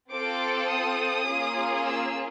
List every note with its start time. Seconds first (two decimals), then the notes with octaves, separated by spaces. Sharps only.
0.11 C4 F4 A4 D6
0.69 D#6
1.27 A#3 C#4 F4 G#4
1.86 E6